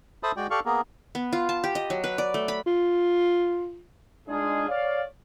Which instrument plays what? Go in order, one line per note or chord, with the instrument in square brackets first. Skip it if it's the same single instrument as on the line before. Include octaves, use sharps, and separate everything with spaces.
[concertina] A4 C5 E5 A5 B5 D#6
G#3 F#4 D5 G5
G4 A4 D5 F5 C#6
A#3 B3 G#4 A#4
[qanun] B3
F4
A5
G4
D#5
F#3
B4
D5
A3
B5
[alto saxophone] F4
[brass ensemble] G#3 D4 D#4 F4 G#4
C#5 D5 F5